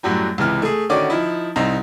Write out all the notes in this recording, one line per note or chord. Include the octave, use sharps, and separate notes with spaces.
F#2 A2 F#3 G3
C#2 C3 E3 F6
A3 G#4
D3 D#3 C#4 F#4 D5 D6
F3 D#4 E4
C2 C4 D#4 A#5